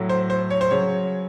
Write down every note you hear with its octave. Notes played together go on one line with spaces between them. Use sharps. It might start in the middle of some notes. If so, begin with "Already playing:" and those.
Already playing: A2 F#3 A3
C5
C5
C#5
C5
C#3 F#3 C#5